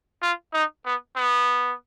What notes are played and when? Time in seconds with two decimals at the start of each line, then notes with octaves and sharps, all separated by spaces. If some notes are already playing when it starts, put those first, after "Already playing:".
0.22 F4
0.54 D#4
0.85 B3
1.17 B3